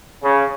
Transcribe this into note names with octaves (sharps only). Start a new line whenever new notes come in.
C#3